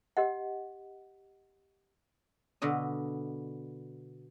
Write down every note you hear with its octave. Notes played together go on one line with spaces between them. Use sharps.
G4 D#5 F#5
B2 D3 D#5